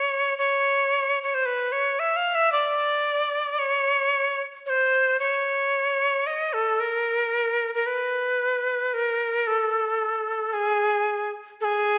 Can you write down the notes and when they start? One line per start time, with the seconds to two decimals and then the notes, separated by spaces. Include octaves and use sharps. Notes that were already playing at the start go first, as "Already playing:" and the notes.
Already playing: C#5
0.38 C#5
1.23 C#5
1.34 C5
1.46 B4
1.72 C#5
1.99 E5
2.16 F5
2.35 E5
2.52 D5
3.59 C#5
4.66 C#5
4.70 C5
5.19 C#5
6.27 D#5
6.53 A4
6.80 A#4
7.75 A#4
7.86 B4
8.94 A#4
9.47 A4
10.53 G#4
11.61 A4
11.64 G#4